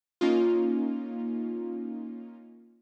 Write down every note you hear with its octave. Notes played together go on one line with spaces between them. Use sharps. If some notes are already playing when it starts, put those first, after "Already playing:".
A#3 C#4 D#4 F4